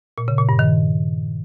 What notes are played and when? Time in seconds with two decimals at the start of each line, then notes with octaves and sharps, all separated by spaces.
0.18 A#2
0.28 C#3
0.38 A#2
0.49 G2
0.59 D#3